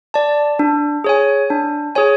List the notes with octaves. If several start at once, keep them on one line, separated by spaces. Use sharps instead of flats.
D5 A5
D4
G#4 C#5 G#5
D4
G#4 C#5 G#5